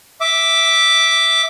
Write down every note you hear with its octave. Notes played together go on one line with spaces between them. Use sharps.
E5 D6